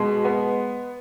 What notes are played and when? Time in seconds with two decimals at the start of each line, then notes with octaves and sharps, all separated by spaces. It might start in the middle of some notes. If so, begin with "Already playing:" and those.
Already playing: B2 G#3
0.25 B3